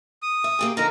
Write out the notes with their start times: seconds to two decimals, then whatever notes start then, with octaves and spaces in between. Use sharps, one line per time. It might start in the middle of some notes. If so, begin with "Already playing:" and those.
0.23 D#6
0.44 E5
0.59 A#3 G4 G#4
0.77 D3 F3 D#4 A#4 A#5